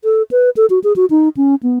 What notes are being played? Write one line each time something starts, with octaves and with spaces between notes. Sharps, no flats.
A4
B4
A4
F#4
G#4
F#4
D#4
C#4
B3